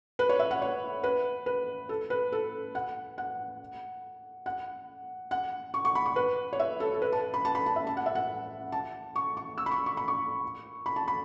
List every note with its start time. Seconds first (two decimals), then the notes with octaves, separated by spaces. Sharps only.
0.19 B4
0.29 C#5
0.39 E5
0.51 F#5
0.62 C#5
1.03 B4
1.46 B4
1.89 A4
2.10 B4
2.32 A4
2.75 F#5
3.18 F#5
4.46 F#5
5.31 F#5
5.74 C#6
5.85 C#6
5.95 B5
6.06 C#6
6.16 B4
6.53 C#5
6.60 E5
6.80 A4
6.94 A4
7.02 B4
7.12 A5
7.34 B5
7.45 A5
7.55 B5
7.66 A5
7.76 E5
7.87 A5
7.97 F#5
8.06 E5
8.15 F#5
8.72 A5
9.16 C#6
9.37 C#6
9.58 E6
9.66 B5
9.71 C#6
9.86 C#6
9.97 B5
10.08 C#6
10.86 B5
10.96 A5
11.08 B5